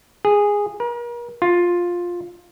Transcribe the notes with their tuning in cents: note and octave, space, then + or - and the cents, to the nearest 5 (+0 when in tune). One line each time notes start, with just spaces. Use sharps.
G#4 -15
A#4 +40
F4 +10